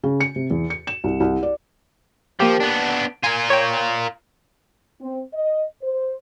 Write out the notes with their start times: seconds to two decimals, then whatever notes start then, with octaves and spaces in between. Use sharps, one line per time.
0.04 C#3
0.20 C#7
0.36 C3
0.51 E2
0.70 C#7
0.87 E7
1.04 C2
1.20 C2
1.43 D5
2.40 F3 A#3 G4
2.61 B3 D4
3.24 F4 A#4 G#5
3.50 C#5 G5
5.01 C4
5.34 D#5
5.83 C5